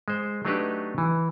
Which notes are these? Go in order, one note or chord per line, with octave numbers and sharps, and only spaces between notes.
G#3 C5
F#3 A3 D4 D#4 G4 B4
E3